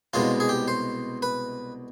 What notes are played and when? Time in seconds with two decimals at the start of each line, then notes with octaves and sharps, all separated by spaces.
0.13 C2 B2 G#3 C#4 F4
0.40 G#4
0.49 G4
0.68 C5
1.22 B4